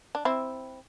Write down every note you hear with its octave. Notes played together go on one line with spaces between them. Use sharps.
D4
C4 E4